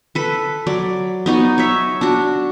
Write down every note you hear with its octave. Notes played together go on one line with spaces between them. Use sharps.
A4 B4
F#3 D5
B3 D#4 F#4 D#5
C#5 E5
D4 F#4